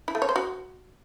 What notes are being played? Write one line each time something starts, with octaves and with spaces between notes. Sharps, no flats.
E4
A3
C#5
C5
F#4